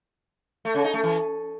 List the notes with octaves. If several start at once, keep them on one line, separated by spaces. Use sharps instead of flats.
A3
C#3
D#4
A3
E3